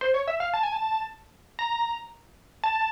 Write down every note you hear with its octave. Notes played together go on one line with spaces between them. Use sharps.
C5
C#5
E5
F5
A5
G#5
A5
A#5
A5